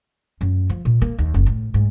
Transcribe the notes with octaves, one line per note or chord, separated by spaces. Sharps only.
F#2
F3
A#2
A#3
D#2
F#1
A2
G#2